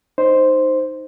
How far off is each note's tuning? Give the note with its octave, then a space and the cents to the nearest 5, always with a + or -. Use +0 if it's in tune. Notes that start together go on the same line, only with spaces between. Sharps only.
D#4 +0 C5 +0